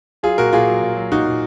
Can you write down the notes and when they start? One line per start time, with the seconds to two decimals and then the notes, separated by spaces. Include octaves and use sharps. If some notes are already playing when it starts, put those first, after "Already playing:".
0.23 F#3 F4 G#4
0.38 A#2 F#4 A#4
0.53 A#2 F4 G#4
0.68 F#3
0.83 A#2
0.96 F#3
1.11 A#2 D#4 F#4
1.26 A#2